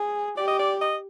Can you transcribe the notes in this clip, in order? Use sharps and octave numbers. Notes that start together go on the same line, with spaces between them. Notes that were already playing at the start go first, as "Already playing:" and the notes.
Already playing: G#4
G4 D5
D#5
D5
D#5